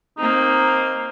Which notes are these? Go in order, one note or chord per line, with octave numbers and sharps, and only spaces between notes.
A#3 C4 D#4